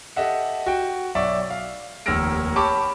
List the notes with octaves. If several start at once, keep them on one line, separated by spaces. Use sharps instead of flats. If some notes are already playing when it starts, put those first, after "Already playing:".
G4 A4 D#5 E5 F#5
F#4 G5
B1 D5 E5 C#6
F5
F1 D#2 E6 F6 A#6 D7
G4 C#5 A5 B5 C#6 D6